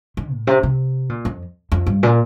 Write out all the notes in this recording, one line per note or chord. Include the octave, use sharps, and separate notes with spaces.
D#3
A2
C3
C3
A#2
F2
F2
G2
A#2